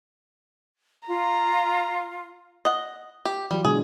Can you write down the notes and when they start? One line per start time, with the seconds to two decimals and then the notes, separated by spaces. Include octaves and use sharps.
1.08 F4 A#5
2.65 D#5 F#5
3.25 G4
3.51 E3 F#3 G3 F4
3.65 B2 D3 G#3 G#4